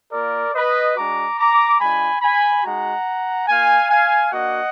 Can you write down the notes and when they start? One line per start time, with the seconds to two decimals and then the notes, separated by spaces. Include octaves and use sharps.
0.12 A#3 F4 A#4 D5
0.54 B4 D#5
0.96 G#3 D4 F#4 A#5 D6
1.38 A#5 D6
1.80 G#3 D4 F4 G#5 B5
2.22 G#5 B5
2.64 G#3 D#4 F#4 F#5 A#5
3.48 A#3 F4 F5 G#5
3.89 F5 G#5
4.32 A#3 D4 F#4 D#5 F#5